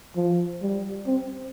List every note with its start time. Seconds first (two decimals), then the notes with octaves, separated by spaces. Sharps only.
0.16 F3
0.62 G3
1.07 C4